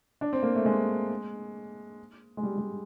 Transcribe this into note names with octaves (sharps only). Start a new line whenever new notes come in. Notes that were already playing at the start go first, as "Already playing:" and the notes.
D4
C4
A#3
A3
G#3
G#3
G3
G3